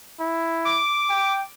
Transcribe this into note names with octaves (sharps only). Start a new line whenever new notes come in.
E4
D6
G5